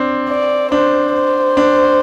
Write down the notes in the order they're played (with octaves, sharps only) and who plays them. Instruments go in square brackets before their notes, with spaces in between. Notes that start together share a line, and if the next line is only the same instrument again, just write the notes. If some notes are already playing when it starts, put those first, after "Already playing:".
Already playing: [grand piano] C4 D4
[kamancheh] D5
[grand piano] D4 [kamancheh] C5
[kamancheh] C5
[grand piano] D4